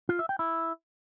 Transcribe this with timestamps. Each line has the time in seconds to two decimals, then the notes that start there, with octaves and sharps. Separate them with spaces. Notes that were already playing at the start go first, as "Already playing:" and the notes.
0.09 F4
0.19 E5
0.29 G5
0.39 E4